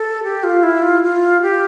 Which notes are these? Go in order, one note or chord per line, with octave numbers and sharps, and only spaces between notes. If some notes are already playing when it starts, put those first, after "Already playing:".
Already playing: A4
G4
F4
E4
F4
F4
G4